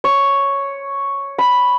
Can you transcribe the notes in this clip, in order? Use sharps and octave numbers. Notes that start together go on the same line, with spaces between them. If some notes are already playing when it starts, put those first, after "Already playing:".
C#5
B5